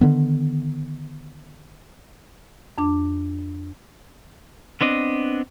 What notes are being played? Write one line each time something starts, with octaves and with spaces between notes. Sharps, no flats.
D3 D#3 B3
F2 D4 D6
B3 C4 D4 D#5